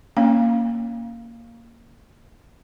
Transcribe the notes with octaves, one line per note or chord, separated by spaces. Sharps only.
A#3 C#4 F5